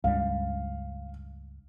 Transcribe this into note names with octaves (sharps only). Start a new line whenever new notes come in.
C#2 G2 G3 F5